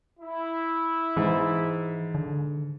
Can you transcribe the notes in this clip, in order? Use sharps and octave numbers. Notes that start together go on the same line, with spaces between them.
E4
G#2 E3
D3